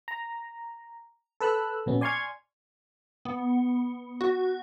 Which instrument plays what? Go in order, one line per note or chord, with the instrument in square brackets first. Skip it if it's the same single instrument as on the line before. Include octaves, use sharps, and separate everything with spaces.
[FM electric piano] A#5
A4 B4 E6 F#6
A#1 B2 B3 C#4
D5 G#5 C6 C#6 F6 G#6
[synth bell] B3
F#4